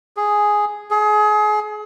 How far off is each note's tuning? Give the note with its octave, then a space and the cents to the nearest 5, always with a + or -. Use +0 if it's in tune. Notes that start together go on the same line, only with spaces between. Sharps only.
G#4 +0
G#4 +30